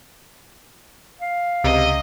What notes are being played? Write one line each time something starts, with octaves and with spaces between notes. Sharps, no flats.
F5
C#2 C3 D#5